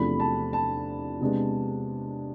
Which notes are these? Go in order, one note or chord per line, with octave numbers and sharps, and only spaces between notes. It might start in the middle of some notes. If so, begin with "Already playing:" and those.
Already playing: E2 C3 F3 A3 D4 B5
A5
A5
C3 G#3 B3 D4